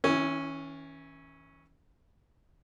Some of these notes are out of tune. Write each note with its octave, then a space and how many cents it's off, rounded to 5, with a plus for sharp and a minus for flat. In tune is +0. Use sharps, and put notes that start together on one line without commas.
E3 -45 C#4 -5 E4 +0